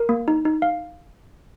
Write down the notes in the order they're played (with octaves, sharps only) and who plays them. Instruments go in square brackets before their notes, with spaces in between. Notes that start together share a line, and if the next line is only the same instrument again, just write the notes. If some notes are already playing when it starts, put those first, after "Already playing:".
Already playing: [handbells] A#4
A#3
D#4
D#4
F5